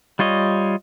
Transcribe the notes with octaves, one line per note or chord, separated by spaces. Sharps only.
G3 F4 C#5 D#5